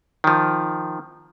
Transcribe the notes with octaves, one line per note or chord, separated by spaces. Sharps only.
D#3 F3